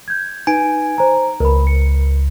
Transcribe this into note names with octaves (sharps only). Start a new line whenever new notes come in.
G6 G#6
D#4 B4 G#5 D7
C5 A#5
C#2 A#4 B5
C#7